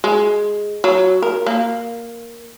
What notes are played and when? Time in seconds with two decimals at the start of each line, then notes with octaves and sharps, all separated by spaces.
0.04 G#3
0.84 F#3
1.22 A#4
1.47 A#3